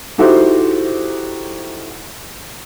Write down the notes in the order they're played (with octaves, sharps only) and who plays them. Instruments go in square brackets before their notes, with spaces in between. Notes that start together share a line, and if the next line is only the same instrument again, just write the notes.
[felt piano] D#4 E4 F#4 G4 A4 C5